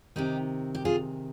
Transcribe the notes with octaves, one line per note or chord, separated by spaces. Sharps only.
C3 D#3 D#4 G4
G4
F4 G#4